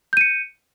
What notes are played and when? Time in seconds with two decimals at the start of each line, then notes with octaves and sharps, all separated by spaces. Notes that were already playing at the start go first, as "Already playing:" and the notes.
0.13 G6
0.17 D#7
0.21 C#7